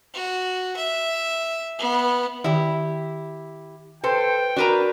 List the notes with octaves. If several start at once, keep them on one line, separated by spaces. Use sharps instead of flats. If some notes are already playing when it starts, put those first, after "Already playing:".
F#4
E5
B3
D#3 E4 G4
A4 B4 C5 G5
D4 F#4 A#4 B4 A#5